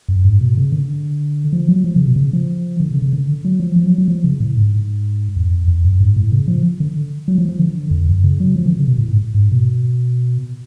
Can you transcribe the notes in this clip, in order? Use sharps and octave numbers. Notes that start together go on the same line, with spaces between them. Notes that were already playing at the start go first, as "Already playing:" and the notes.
F#2
G#2
B2
C#3
D3
F3
F#3
F3
C#3
B2
C#3
F3
D3
C#3
C#3
D3
F#3
F3
F3
F#3
F#3
F3
C#3
A2
G#2
F2
F2
F#2
G#2
A2
C#3
F3
D3
F#3
F3
F3
D3
F2
F#2
C#3
F#3
F3
D3
C#3
B2
A2
G#2
G#2
B2